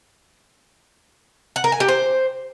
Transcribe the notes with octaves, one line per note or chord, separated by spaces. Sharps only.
F#5
A#4
G#5
G4
C5